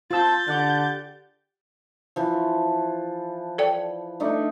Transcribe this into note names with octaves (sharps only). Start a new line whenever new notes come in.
C4 F4 A5 E6 G6 A6
D3 G4 D5 F#5
E3 F3
A4 D5 G5
A3 D4 D#4